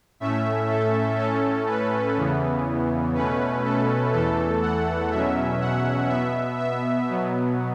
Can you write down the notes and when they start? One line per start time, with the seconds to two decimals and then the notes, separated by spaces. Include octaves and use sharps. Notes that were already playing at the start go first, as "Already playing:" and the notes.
0.20 A2 A3 C#4 E5
0.69 A4
1.18 A2 A3 C#4 A4
1.67 B4
2.17 E2 C#3 E3 B3
3.14 B2 A3 C#4 B4
3.64 A4
4.12 E2 E3 A3 A4
4.62 F#5
5.11 E2 B2 F#3 C#4 E5
5.60 F#5
6.09 B2 B3 E5
6.59 E5
7.07 B2 F#3 B3